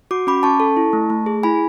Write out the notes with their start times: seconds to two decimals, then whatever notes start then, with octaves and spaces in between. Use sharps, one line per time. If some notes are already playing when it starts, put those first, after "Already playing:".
0.11 F#4 D6
0.27 C#4 B5 D6
0.43 C#4 A5 C#6
0.60 A4
0.77 E4
0.93 A3
1.10 A3
1.26 G#4
1.43 E4 G#5 B5